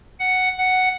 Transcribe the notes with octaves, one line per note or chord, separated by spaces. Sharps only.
F#5
F#5